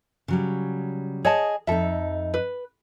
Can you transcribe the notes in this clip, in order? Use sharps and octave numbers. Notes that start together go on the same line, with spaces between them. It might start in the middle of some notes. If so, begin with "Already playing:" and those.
C#3 F#3 G3
G#4 C#5 D#5 A5
F2 D#4 A4 E5
B4